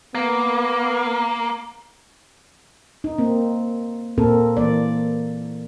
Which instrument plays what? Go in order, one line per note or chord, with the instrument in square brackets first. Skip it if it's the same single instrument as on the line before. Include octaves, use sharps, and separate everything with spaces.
[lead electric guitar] A#3 [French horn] B3
[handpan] D#4
A#3 C4
A#2 A#3 C4 A4 A#4
E3 A#3 D5